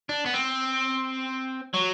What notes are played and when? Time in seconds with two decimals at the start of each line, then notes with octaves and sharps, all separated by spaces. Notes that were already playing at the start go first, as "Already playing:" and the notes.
0.09 D4
0.26 B3
0.34 C4
1.74 F#3